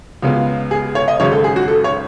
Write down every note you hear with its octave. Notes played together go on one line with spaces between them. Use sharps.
C#2 C#3 G#3 B3
G#4
C#5
D#5
G#1 F#2 C#3 G#3 C#4 C#5
A4
G#4
F#4
A4
C#5